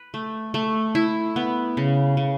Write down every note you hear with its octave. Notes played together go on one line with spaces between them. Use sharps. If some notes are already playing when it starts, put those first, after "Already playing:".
Already playing: B4
A3
A3
E4
B3
C#3
C#3